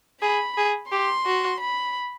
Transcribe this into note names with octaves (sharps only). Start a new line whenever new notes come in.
G#4 B5
G#4
G4 C6
F#4
B5